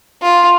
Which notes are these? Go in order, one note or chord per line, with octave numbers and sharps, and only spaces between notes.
F4